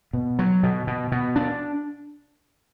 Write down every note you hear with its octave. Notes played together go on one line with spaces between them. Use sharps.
B2
F#3
B2
B2
B2
D4